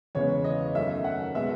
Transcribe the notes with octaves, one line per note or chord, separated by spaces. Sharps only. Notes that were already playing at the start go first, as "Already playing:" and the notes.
E2 C#3 G#3 B3 C#5
D#5
F#2 D#3 A3 C#4 E5
F#5
B2 G#3 B3 E5